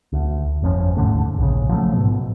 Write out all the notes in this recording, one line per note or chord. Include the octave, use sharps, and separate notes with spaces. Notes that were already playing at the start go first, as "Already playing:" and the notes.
D2
G1 F2 F3 C#4
D#2 G#2 D3 A3
A#1 C#3
F3 F#3 G#3 A3
G#2 B2